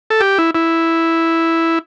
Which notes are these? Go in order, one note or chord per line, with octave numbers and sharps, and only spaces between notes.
A4
G4
E4
E4